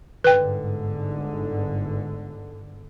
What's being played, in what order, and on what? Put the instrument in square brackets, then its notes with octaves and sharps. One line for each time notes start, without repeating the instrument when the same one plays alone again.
[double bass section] G1 G#2 D3 [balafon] B4 G5